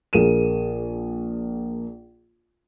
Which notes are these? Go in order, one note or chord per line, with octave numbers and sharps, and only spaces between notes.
A#1 A#3 G#4 D#7 E7